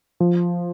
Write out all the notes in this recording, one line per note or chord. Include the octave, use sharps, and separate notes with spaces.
F3